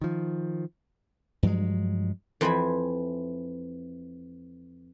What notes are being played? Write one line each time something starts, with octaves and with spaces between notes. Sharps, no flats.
D#3 F3
G2 F3 F#3 G#3
F2 E3 C5 G5 G#5 B5